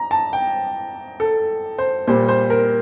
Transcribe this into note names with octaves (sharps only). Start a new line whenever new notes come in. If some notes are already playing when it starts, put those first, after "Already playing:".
Already playing: A#5
A5
G5
A4
C5
A#2 G3 C5
C5
A#4